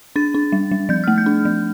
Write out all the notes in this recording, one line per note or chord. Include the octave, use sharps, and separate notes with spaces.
D4 A6
D4
G3
G3
F3 G6
A3 F6
G6
D4
F3